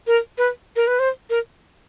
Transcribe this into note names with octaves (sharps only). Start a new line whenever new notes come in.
A#4
B4
A#4
B4
C5
A#4